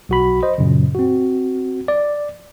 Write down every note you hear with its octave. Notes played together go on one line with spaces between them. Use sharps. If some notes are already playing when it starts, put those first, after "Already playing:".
B1 F#4 B5
C5 D#5
F#2 A#2 C#3
C4 F#4
D5